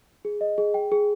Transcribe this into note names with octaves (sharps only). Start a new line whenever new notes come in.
G#4
D#5
G#4
G5
G#4